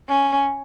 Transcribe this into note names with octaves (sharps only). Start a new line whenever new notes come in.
C#4